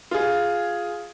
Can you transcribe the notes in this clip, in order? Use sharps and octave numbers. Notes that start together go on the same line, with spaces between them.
F4 G#4